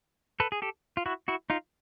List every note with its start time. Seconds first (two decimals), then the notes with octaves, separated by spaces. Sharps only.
0.40 A4 B4
0.52 G#4
0.62 G4 A4
0.97 F4
1.06 E4 F#4
1.28 E4 F#4
1.50 D#4 F4